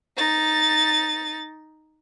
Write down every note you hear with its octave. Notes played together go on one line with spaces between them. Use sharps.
D#4 A6